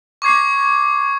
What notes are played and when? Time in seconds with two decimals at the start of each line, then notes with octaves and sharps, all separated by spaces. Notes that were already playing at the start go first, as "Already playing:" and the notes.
0.22 C#6 D6 G#6 C7